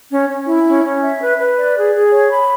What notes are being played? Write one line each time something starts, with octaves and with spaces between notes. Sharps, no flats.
C#4
C#4
E4
C#4
C#4
E5
B4
B4
D5
G#4
G#4
C#5
B5